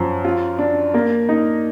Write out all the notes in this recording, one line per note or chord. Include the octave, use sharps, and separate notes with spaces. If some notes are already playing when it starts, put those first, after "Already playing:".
Already playing: F#2 F3
F4
D4
A#3
D#4